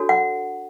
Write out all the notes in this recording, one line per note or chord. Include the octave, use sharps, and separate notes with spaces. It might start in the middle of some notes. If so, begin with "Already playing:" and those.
Already playing: D4 F#4 A4 C#5
F#5